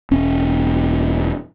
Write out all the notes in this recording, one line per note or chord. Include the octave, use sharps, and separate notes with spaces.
E1 C#4